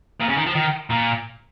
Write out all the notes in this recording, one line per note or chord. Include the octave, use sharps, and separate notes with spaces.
A#2
C#3
D#3
F3
D#3
A#2